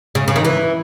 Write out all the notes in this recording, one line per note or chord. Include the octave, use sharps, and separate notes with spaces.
C#3
C#3
D#3
E3